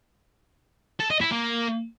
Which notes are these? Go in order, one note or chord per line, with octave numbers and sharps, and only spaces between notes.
A4
D#5
E4
A#3